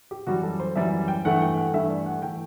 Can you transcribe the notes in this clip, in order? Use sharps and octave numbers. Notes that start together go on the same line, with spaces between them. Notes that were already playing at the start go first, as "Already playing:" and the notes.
G4
F#2 E3 G3 F#4
A4
C5
F#2 E3 G3 E5
G5
G2 E3 A3 F#5
G5
F#5
G2 E3 A3 E5
D5
F#5
E3 A3 G5